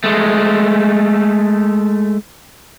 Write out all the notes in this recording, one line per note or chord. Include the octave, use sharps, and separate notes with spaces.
G#3 A3